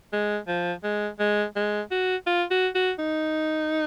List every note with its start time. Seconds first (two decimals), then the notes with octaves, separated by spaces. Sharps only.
0.13 G#3
0.48 F3
0.83 G#3
1.20 G#3
1.56 G#3
1.91 F#4
2.27 F4
2.51 F#4
2.75 F#4
2.99 D#4